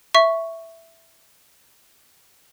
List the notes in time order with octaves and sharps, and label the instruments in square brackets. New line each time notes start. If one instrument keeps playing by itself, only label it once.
[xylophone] E5 C#6